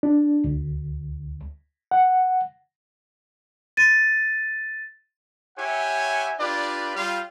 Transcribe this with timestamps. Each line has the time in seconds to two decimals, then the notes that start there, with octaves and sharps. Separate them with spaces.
0.03 D4
0.44 D2
1.91 F#5
3.77 A6 D#7
5.57 E4 G4 C#5 E5 F#5 G#5
6.39 D4 F4 G4 B4 D5
6.96 G3 F4 F5